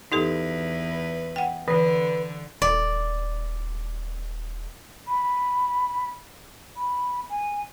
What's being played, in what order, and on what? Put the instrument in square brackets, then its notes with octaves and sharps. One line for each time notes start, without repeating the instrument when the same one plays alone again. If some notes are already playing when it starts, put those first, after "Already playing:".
[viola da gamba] E2 B4 [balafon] D#4 G4 A4
[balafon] F#5 G5
[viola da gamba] D3 [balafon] E3 [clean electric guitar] B4
[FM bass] D#1 [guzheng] D5
[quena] B5
B5
G#5